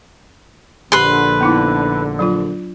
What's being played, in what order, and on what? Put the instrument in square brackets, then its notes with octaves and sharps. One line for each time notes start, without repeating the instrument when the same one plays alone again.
[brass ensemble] A#1 D3 [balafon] G4 [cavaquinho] B4 C6
[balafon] B3 D#4 E4
F#3 D4 F4